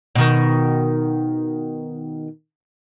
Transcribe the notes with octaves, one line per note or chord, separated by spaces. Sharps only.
B2 D#3